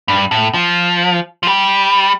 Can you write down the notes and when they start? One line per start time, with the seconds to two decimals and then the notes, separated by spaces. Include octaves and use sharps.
0.08 G2
0.31 A2
0.54 F3
1.43 F3
1.47 G3